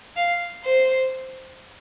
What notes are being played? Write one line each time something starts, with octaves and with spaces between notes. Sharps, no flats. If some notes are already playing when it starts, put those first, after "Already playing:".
F5
C5